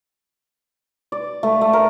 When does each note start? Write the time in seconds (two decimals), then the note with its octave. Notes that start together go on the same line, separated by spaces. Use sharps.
1.12 D5
1.43 A3
1.61 A3
1.73 A#4